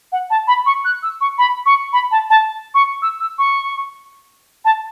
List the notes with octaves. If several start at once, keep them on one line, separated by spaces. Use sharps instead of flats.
F#5
A5
B5
C#6
F#6
E6
C#6
B5
C#6
B5
A5
A5
C#6
E6
E6
C#6
A5